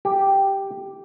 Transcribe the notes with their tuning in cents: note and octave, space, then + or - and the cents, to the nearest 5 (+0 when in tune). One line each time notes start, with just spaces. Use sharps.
G4 +0